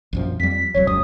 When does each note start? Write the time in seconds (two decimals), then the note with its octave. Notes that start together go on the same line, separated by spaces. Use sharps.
0.13 A#1 F#2 F3
0.40 F2 G3 B6
0.75 E1 C2 F#3 C#5
0.87 F1 C#2 F#2 D#6